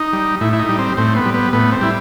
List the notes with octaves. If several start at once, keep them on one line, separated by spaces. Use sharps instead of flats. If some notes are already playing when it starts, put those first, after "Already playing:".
Already playing: D#4
G3
A2 E4
E4
D#4
G3
C4
A2 C4
B3
G3
B3
A2 B3
C4
G3 E4